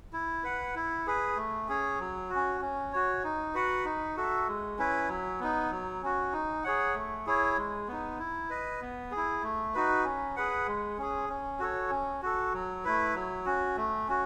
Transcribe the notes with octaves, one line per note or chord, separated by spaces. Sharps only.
E4
B4 F#5
E4
G#4 B4
A3
C#4 G#4 C#5
F#3
F#4
C#4
C#4
F#4 C#5
D#4
F#4 B4 F#5
D#4
F#4 A4 E5
G#3
C#4 E4 B4
F#3
B3 D#4
F#3
C#4 F#4
D#4
G#4 C#5 F#5
A3
E4 G#4 C#5
G#3
B3 D#4
E4
B4 D#5
B3
G#4
E4
A3
D#4 F#4 B4
C#4
G#4 B4 F#5
G#3
C#4 G#4
C#4
F#4 A4 C#5
C#4
F#4 A4
F#3
A3 E4 B4
F#3
C#4 F#4
A3
C#4 F#4